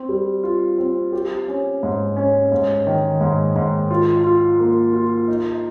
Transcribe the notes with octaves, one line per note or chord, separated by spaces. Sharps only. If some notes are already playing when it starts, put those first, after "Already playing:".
Already playing: C4
G3
F4
C4
G4
C#4
G#2
C#4
G#2
D#3
G#2
G#2
F4
F4
A#3
F4
D#4